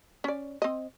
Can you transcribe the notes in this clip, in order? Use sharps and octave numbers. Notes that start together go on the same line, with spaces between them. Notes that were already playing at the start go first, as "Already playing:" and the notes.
C#4 D5
C4 D#5